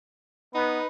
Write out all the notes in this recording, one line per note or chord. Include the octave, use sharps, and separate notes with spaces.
B3 D#4 B4